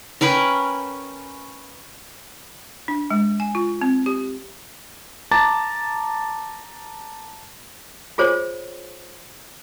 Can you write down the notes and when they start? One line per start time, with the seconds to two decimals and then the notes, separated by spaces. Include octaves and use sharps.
0.21 C#4 A#4 B4 G5
2.88 D4
3.11 G#3
3.40 G#5
3.55 F4
3.81 C4
4.06 G4
5.31 A5 A#5 D6 A6
8.18 F4 G#4 C5 C#5